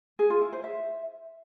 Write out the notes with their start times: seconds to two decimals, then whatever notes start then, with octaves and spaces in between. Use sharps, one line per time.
0.19 G#4
0.30 F4
0.41 E4
0.53 C5
0.64 E5